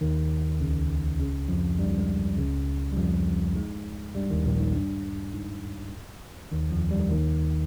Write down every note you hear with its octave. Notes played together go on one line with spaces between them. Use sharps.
D#2 D#3
C#2 C#3
C#2 C#3
F2 F3
G2 G3
G#2 G#3
C#2 C#3
G3
F2 F3
G#2 G#3
G2 G3
D#2 D#3
A#1 A#2
G#2
G2
G#2
D#2 D#3
F2 F3
G2 G3
D#2 D#3